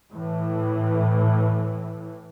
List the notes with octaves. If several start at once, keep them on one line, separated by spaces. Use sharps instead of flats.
A2 E3